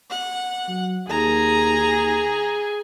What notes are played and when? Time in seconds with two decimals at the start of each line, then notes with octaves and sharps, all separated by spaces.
0.10 F#5
0.68 F#3
1.09 D#2 G#4 A#5